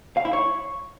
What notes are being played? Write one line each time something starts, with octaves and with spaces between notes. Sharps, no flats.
F5
E4
C#5